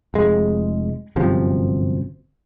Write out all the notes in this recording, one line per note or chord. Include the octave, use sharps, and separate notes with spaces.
F1 G#3
G1 F#2 C3 F3